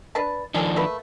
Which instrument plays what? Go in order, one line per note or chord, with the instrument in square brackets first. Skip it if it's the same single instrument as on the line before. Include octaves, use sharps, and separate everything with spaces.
[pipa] D4 B4 A5
[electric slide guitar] D#3 F3 D4 [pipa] C#4 G#4 A4
[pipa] A3 A#3 B4